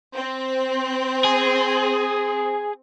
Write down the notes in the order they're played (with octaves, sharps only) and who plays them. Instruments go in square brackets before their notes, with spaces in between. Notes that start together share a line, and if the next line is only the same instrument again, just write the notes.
[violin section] C4
[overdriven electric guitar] G#4